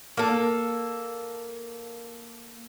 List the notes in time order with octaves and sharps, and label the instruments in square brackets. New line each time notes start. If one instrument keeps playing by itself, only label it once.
[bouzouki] A#3 A4